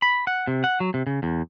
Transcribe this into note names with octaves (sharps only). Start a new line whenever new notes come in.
B5
F#5
C3
F#5
F#3
C3
C#3
E2